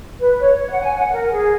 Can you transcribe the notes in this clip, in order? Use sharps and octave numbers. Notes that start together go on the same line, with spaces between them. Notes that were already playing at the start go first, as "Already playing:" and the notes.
B4
C#5
C#5
F#5
G#5
F#5
A#4
G#4